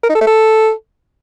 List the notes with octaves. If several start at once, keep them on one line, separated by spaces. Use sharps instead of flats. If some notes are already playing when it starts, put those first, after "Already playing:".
A#4
D#4
A4
A3
A4